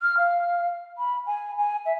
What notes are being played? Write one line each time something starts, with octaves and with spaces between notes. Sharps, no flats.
F6
F5
B5
G#5
G#5
E5